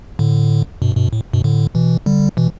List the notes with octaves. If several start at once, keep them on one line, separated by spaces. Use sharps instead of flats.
A2 D3
G2 B2
G2 B2
A2
G2 B2
A2 D3
B2 E3
D3 G3
B2 E3